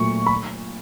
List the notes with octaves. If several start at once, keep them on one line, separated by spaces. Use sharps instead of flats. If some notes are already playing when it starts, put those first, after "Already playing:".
Already playing: A#2 F#3 A3 C#6
B5